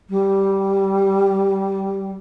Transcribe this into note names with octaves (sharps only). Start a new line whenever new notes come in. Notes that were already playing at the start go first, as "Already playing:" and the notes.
G3